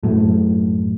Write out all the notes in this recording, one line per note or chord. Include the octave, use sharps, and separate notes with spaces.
F#2 A2